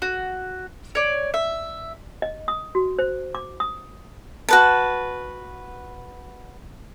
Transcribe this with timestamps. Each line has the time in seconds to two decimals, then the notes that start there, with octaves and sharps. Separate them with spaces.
0.02 F#4
0.95 C#5 D5
1.34 E5
2.22 D#5
2.48 D#6
2.75 F#4
2.99 C5
3.35 D6
3.60 D#6
4.49 F#4 B4 A5